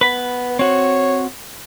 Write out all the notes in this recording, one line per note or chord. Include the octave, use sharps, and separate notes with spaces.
B3 B4 B5
C4 F#4 C#5